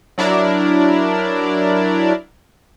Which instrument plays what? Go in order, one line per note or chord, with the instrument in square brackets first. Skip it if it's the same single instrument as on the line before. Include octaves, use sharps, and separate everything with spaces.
[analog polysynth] F#3 D4 E4 A#4 D5